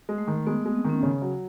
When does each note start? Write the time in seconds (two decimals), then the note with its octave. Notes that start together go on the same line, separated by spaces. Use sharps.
0.09 G#3
0.18 A3
0.28 D#3
0.47 G#3 B3
0.62 B3
0.66 G#3
0.75 C4
0.85 D#3 C#4
1.03 C#3
1.22 F#3